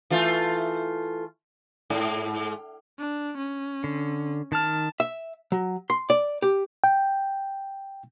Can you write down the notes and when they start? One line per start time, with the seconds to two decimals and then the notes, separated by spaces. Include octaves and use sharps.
0.10 E3 A3 F4
1.90 G#2
2.99 D4
3.37 C#4
3.84 D3
4.52 D#3 A5 F6
5.00 E5
5.52 F#3
5.90 C6
6.10 D5
6.42 G4
6.84 G5